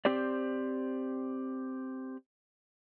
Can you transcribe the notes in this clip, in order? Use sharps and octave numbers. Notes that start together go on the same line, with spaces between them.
C4 G4 C5 D5